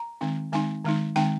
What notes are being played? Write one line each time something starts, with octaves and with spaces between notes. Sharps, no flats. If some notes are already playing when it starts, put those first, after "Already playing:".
Already playing: A#5
D#3 G#3 C4 D#4
D#3 G#3 C4 D#4 G#5
D#3 G#3 C4 D#4
D#3 G#3 C4 D#4 G5